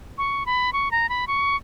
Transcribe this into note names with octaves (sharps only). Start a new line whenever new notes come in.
C#6
B5
C#6
A#5
B5
C#6